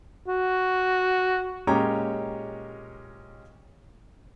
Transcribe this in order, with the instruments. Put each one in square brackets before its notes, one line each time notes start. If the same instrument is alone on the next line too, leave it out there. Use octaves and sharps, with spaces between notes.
[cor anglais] F#4
[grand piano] A#2 G#3 C#4 G4 C#5 A#5